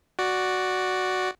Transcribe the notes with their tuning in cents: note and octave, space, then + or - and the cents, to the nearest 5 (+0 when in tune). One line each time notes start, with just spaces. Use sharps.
F#4 +0 D5 +0